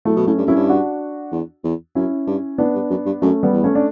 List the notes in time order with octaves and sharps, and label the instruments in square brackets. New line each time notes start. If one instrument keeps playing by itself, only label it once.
[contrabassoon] A2 [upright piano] F#3 A3
[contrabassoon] B2
[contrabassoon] A2 [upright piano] A3 C#4
[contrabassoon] G2
[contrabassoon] F#2 [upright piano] C#4 E4
[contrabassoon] G2
[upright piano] D4 F#4
[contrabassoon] E2
E2
[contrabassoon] F#2 [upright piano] C#4 E4
[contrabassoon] G2
[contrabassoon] A2 [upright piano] B3 D4
[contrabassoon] G2
F#2
G2
[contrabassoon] F#2 [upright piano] A3 C#4
[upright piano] G3 B3
[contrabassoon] E2
[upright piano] A3 C#4
D4